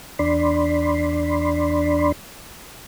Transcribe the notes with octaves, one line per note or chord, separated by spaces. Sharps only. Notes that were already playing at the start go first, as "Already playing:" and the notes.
E2 D4 D5 B5 C6